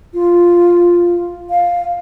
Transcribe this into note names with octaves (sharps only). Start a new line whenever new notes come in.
F4
F5